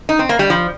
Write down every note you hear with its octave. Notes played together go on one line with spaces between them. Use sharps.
D#4
C4
A#3
G3
F3